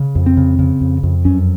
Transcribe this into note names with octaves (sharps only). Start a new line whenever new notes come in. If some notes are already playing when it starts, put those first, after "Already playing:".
Already playing: C#3
F2
C4
C#3
C#3
F2
F2
F#2 C#4